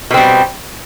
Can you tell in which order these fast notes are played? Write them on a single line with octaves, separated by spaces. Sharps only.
B2 C4 G3